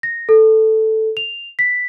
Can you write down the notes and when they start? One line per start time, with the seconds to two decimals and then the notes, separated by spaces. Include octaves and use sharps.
0.03 A#6
0.29 A4
1.17 F7
1.59 B6